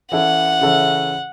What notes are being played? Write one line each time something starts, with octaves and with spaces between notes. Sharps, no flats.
E3 C#4 E4 A4 E5 F#5
C#3 E3 C#4 A4 E5